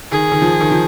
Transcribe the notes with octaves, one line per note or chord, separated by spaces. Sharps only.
D#3 G#4
D#3
F3
D#3
F3